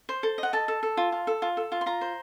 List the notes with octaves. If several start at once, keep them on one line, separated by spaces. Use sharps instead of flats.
C5
A4
D#5
F#5
A4 A5
A4
A4
F4
F4
A4
F4
A4
F4
C6
F4 A#5
C5